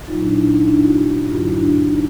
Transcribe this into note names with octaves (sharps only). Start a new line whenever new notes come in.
A#2 F#3 D#4 F4
D4 E4
D4 E4
C#4 D#4
D4 E4
E4 F#4
G2 D3 F#3 F4 G4
E4 F#4
D4 E4
C#4 D#4